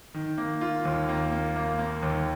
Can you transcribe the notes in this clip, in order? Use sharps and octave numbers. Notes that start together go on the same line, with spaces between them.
D#3
A#3
F4
D#2
A#3
A#3
A#3
A#3
D#2